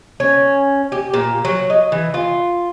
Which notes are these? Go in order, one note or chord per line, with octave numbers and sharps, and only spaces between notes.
C#4
G4
A#2
F#3
D#5
E3
F4